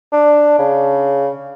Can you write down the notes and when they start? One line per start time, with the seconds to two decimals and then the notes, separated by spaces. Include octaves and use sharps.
0.13 D4
0.59 C#3